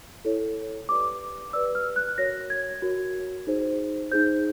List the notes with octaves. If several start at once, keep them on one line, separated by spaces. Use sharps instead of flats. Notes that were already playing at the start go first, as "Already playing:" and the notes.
E4 A4 C#5
G4 B4 D5 D6
G4 B4 D5 E6
F6
F#6
F#4 A#4 C#5 A#6
G#6
F#4 A#4 C#5
D#4 G#4 C5
D#4 G#4 C5 G6